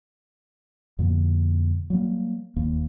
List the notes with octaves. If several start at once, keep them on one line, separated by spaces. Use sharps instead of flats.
F2 B2 D3 A#3
F#3 G3 A#3
E1 D#2 A#3